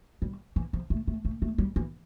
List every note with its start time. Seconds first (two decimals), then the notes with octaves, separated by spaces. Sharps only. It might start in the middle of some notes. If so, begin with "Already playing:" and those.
0.22 G3
0.56 E3
0.73 F3
0.90 A3
1.08 A3
1.25 A3
1.42 A3
1.58 G3
1.76 E3